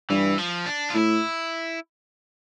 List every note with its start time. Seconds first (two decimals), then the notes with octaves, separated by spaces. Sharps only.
0.10 G2 E3
0.38 F3
0.66 D4
0.90 F4
0.94 A2 E4